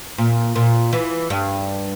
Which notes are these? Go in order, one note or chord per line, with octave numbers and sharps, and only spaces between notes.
A#2
A#2
E3
G2